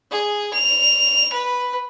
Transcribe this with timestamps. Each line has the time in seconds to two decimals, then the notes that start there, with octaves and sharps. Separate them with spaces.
0.11 G#4
0.53 F7
1.32 B4